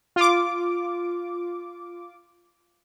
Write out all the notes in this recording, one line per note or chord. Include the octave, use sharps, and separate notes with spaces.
F4 D6